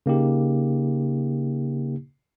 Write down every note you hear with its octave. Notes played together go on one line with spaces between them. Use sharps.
C#3 A#3 D#4 G4